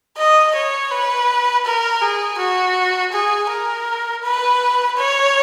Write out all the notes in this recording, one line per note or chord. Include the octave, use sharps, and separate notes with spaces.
D#5
C#5
B4
A#4
G#4
F#4
G#4
A#4
B4
C#5